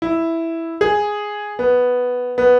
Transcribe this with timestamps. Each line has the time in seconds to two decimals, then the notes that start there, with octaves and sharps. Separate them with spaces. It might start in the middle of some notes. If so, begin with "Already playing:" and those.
0.02 E4
0.81 G#4
1.59 B3
2.38 B3